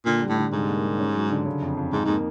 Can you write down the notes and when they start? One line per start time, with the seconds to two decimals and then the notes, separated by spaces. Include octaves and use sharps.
0.06 A#2 D3
0.21 G3
0.29 A2
0.38 D3
0.53 C2 G#2
0.69 A#3
0.85 G3
0.99 C#4
1.15 F#3
1.30 D3
1.46 C#3
1.62 F2
1.77 F2
1.93 G#2 D#4
2.05 G#2 A#3